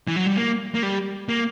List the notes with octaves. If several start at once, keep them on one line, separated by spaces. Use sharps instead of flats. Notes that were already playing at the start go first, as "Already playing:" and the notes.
E3
F#3
G3
A#3
A#3
G3
A#3